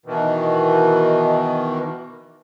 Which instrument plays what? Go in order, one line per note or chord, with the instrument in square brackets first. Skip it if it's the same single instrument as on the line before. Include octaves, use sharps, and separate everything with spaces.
[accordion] B2 D#3 E3